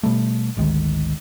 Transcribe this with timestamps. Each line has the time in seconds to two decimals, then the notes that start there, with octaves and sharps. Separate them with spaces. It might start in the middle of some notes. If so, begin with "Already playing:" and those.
0.03 B2 G3 A3
0.57 G#1 D2 D#3 G#3